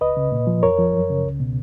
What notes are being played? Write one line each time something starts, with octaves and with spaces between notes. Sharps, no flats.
C#2 B4 D#5
C#3
A#2
F3
F2 A#4 C#5
F3
F#2
C#3
C#2
B2